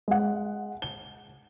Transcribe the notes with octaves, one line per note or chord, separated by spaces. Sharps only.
G#3 F#5
G7